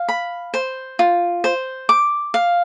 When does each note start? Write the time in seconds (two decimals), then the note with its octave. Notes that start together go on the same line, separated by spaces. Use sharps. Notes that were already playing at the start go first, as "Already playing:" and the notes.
Already playing: F5
0.08 B5
0.54 C5
0.99 F4
1.44 C5
1.89 D6
2.34 F5